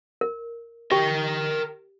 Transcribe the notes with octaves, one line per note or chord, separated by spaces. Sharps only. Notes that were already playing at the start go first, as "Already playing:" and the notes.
A#4
G4 A#4 G5